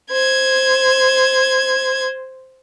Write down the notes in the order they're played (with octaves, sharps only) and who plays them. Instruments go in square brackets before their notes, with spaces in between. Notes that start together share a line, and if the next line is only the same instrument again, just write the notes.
[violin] C5 G#6